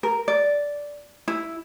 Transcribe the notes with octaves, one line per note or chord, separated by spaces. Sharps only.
A#4
D5
E4